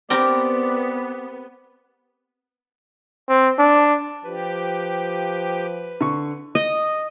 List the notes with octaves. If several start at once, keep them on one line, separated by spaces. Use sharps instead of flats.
B3 C4 G4 A#4 D5
C4
D4
F3 G4 B4
D3 C#6
D#5